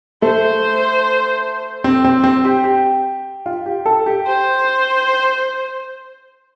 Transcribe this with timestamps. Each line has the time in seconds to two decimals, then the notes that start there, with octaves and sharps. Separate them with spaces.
0.22 A3 C5
1.84 C4 C5
2.05 C4
2.24 C4
2.44 G4
2.64 G4
3.46 F4
3.66 G4
3.86 A4
4.06 G4
4.26 C5